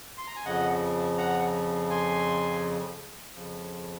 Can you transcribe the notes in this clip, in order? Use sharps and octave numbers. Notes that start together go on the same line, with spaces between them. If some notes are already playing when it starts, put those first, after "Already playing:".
C6
A#5
G#5
F2 C#3 F3 D#5 F#5
F#5 A#5
G#5 C6
F2 C#3 F3